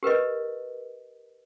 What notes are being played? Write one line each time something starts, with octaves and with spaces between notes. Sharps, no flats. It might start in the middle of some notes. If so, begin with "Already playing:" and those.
G4 A#4 B4 D#5